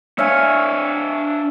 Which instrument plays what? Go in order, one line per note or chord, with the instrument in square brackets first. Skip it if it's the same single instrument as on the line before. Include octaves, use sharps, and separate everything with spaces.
[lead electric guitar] D4 C#5 [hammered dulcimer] E5 F5 G#5